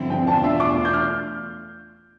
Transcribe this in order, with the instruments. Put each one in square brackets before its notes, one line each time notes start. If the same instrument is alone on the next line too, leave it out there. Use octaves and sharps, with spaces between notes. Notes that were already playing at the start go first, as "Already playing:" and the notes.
Already playing: [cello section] G2 D3 F3 C4 E4
[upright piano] G5
[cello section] E2 B2 A3 D4 F4 [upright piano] A5
[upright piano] E5
D6
G6
F6